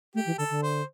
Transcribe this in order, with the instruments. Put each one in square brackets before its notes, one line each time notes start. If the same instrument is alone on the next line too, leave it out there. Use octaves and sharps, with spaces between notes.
[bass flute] A3 [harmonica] G4
[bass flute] E3
[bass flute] D3 [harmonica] A4
[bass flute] D3
[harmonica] C5